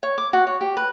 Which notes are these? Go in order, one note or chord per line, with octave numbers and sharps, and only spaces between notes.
C#5
D6
F#4
C#5
G4
B4